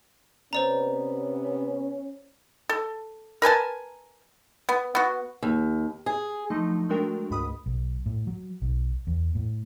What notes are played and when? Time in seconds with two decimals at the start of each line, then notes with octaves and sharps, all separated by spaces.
0.53 C3 B3 C#4 C5 D5 A#5
2.69 A4
3.42 A#4 B4 G#5 A5
4.69 B3
4.95 B3 F#4
5.43 D#2
6.06 G#4
6.50 D3 F3 F#3 A3 D#4
6.89 G#3 A3 D4 F#4 A#4 G5
7.30 C#2 G#2 B5 D#6
7.66 B1
8.06 A2
8.27 F#3
8.62 B1
9.07 E2
9.35 A2